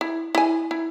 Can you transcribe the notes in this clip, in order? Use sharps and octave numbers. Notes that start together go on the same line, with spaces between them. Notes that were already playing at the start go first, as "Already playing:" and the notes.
E4
E4 G#5
E4